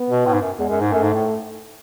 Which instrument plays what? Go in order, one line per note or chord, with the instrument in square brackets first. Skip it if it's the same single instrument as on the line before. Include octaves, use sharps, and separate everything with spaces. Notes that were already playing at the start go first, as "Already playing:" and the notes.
Already playing: [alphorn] B3
[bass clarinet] B2
A2
G#2
F#2
[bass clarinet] E2 [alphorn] G#3
[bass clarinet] F#2
G#2
[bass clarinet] F#2 [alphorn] A3
[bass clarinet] G#2
A2